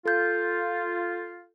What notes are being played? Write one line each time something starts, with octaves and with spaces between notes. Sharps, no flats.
F4 A4 G6